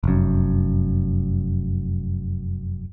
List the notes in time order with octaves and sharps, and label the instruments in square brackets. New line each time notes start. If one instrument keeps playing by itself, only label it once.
[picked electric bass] F1 F#2